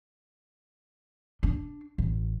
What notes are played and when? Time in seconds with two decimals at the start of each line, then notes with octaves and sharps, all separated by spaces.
1.43 D4
1.98 A1